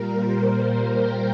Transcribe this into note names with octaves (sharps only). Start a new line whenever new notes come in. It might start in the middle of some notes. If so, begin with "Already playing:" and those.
Already playing: A#2 G3 A#3 A#4
C5
G5